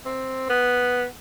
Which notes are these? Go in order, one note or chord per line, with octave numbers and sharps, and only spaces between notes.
C4
B3